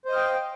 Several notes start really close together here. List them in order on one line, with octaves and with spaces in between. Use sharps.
C5 D#5 F5 G5